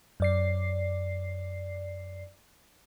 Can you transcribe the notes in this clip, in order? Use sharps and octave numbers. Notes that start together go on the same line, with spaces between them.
F#2 D5 C7